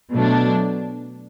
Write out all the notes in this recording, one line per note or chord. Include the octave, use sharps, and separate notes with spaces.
B2 F#3 A3 D4